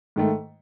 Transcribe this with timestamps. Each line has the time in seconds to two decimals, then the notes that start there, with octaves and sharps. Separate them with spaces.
0.16 G#2 D#3 A3